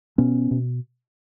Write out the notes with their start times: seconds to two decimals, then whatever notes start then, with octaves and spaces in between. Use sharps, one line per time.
0.18 B2 B3 C#4
0.51 B2